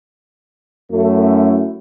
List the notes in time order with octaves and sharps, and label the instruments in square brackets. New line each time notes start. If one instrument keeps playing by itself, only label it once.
[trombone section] F#2 A3 C#4 E4